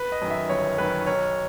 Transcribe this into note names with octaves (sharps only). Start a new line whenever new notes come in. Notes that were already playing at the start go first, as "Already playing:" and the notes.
Already playing: B4
D#5
F#2 D#3
E5
G1 C#5
F#2 D#3 B4
B1 C#5